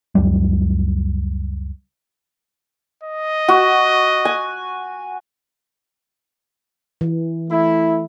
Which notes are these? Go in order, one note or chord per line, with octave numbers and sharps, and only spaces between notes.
C#2 F#2 F#3 G3
D#5
F#4
G#5
E3
A3 E4